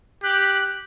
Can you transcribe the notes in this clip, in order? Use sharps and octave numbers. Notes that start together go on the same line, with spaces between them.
G4 F#6